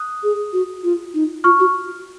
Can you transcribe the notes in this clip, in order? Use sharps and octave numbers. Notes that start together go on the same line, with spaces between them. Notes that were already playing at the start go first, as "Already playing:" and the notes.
Already playing: D#6 F#6
G#4
F#4
F4
D#4
F4 C#6 F6
F#4